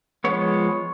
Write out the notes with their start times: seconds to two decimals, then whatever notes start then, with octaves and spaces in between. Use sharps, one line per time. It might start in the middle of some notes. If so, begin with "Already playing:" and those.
0.24 F3 G#3 B3 C#5